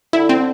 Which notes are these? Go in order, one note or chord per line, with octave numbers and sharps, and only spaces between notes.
D3 E4
C4
D3